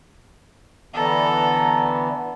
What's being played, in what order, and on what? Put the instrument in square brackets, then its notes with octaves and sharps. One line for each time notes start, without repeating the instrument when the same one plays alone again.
[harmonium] D3 E3 B3 [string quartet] A4 A#5